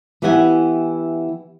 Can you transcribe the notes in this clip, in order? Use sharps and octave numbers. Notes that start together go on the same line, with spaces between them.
E3 B3 E4 G4 F#5 G#5